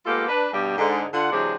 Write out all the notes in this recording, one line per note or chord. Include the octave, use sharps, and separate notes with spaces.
G#3 A#3 B3 F4 G4 A4
D4 B4
G2 B2 G3 G4
G#2 D3
D3 F4 F#5
C3 E3 F#3 G#3 C4 D4